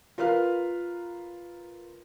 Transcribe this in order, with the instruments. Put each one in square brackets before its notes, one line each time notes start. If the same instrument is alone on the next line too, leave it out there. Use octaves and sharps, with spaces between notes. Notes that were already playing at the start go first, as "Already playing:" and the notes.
[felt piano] F4 A#4 B4 F5 F6